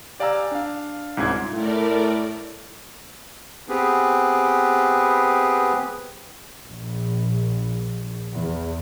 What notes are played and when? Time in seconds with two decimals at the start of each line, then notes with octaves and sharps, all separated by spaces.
0.20 G4 D5 F5 G#5 A#5 E6
0.51 D4 F5
1.17 C2 G#2 C#4 F4 G#6
1.54 A2 A3 A#4 D5
3.69 B3 C4 G4 G#4 B4
6.66 A#1
8.32 E2